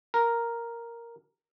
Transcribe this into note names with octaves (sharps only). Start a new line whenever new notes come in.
A#4